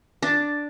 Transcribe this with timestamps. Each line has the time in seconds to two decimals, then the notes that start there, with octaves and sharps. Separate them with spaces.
0.22 D4